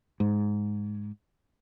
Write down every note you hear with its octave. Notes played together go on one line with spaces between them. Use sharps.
G#2